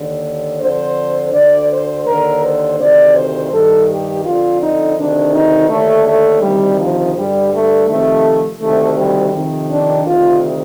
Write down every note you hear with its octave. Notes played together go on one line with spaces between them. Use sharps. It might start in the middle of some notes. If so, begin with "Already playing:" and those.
Already playing: D#2 D3
F2 D3 C5
D2 D3 D5
C5
D#2 D3 A#4
C5
D2 C3 D#3 D5
C5
G2 D#3 A4
G4
F2 D3 F4
D#4
D2 C3 D#3 D4
D#4
D#2 D3 A3
A3
D2 C3 D#3 G3
F3
G2 D3 G3
A3
F2 C3 D#3 A3
D2 C3 D#3 A3
G3
F2 C3 D#3
D4
D2 C3 D#3 F4